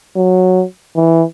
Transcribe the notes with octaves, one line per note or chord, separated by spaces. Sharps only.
F#3
E3